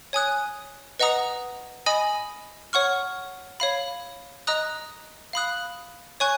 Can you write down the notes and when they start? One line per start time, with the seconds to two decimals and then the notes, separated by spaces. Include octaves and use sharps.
0.13 C#5 G#5 D#6 F#6
0.99 B4 D#5 F#5 A#5 D#6
1.86 D#5 G#5 B5 D#6
2.73 C#5 F#5 C#6 F6
3.60 C#5 F5 B5
4.47 D#5 A#5 D#6 F#6
5.33 F5 B5 D#6 F#6
6.20 C#5 G#5 C#6 F#6